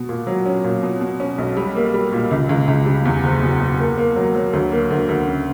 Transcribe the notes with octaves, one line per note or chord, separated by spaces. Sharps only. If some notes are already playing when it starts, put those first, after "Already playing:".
Already playing: B2
A#2
F#3
C#4
A#2
B2
B2
C#4
B1
G3
A#3
G3
A#2
C#2
C#2
C#2
G3
E2
F#1
B2
B2
A#3
A#3
F#3
F#3
D2
A#3
D2
D2
C#3